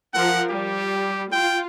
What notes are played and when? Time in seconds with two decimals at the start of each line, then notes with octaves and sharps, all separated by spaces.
0.14 F3 A#4 F#5
0.50 G3 G4
1.32 F4 G5